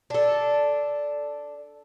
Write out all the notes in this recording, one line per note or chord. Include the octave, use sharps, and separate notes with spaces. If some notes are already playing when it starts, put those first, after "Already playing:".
D4 A4